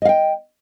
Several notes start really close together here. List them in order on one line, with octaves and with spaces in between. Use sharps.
D#5 F5 G5